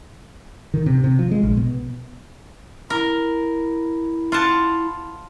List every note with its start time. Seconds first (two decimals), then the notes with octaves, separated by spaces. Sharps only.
0.74 D#3
0.86 C3
1.04 C3
1.19 F3
1.31 G#3
1.43 A#1
1.57 B2
2.90 E4 A#4
4.32 F4 F#5 A5